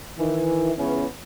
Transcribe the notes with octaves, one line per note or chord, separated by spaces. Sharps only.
D#3 E3
C#2 C#3 E3 B3 C#4